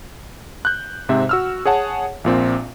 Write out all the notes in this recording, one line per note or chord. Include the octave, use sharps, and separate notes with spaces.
F#6 G6
G#2 C3 C4 E5
F#4 E6 F6
G#4 C#5 F#5 A5
A#1 A#2 C4